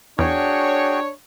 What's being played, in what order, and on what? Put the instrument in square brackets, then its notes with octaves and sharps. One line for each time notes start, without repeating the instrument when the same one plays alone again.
[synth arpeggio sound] E2 [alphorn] D4 [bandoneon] F#4 G#4 G5 [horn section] C#5